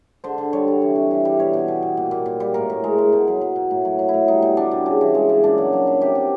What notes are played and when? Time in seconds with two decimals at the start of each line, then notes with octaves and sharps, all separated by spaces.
0.24 D3 C5
0.38 D3
0.53 G3 C#5
0.68 D3
0.82 E3
0.96 C3
1.11 E3
1.25 G3
1.40 B2 C#5
1.53 B2
1.68 B2
1.82 B2
1.97 A#2
2.11 A#2
2.26 A#2
2.40 G3
2.54 A2 A#4
2.70 A2
2.84 G#3
2.98 G#3
3.13 B2
3.28 F#3
3.41 F#3
3.56 B2
3.71 A2
3.85 F#3
3.99 F#3
4.09 E4
4.14 A2
4.28 G3 D#4
4.42 B2
4.57 G3 D4
4.71 B2
4.86 C#3
5.01 E3
5.15 G#3
5.29 C#3
5.44 A#2 D4
5.58 F#3
5.73 F#3
5.87 F#3
6.01 C3 G4
6.15 C3